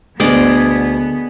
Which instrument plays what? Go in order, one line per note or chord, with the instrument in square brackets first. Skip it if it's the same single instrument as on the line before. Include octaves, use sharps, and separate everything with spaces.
[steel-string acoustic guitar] D2 B2 [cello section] B3 [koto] G#4 D5 D#5